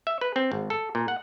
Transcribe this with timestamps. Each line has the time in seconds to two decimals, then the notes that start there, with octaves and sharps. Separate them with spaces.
0.07 E5
0.21 B4
0.36 C4
0.52 G#1
0.70 A4
0.95 A#2
1.08 F#5